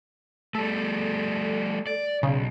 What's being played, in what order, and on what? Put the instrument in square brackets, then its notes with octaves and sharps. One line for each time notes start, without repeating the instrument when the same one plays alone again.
[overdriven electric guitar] G3 A3 [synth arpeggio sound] A4
[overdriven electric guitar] D5
[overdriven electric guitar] B1 [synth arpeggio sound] C#3